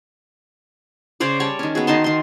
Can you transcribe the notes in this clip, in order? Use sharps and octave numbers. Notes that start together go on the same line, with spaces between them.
C#3 C#4 C5 D5
G3 C#5 D5 A5
D#3 C#4
B3 F#4 G#4
D#3 D#4 A5 C6
D#3 C6